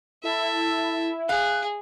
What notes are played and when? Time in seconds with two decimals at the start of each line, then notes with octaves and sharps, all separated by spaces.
0.24 E4 A4 E5
1.29 G#4 F5 F#6